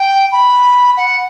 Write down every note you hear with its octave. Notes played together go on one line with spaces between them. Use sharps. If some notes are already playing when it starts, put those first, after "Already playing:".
Already playing: G5
B5
F#5